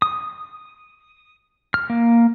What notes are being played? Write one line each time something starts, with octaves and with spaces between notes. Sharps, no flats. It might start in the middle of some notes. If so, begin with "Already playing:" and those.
D#6
F6
A#3